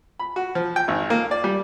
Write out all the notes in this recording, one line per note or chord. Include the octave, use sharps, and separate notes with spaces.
B5
F#4
F3
G5
G#1
A#3
D5
G3